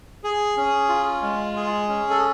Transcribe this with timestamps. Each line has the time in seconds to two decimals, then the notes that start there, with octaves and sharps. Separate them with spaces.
0.24 G#4
0.57 C#4
0.89 F4
1.22 G#3
1.56 G#4
1.89 C#4
2.10 A4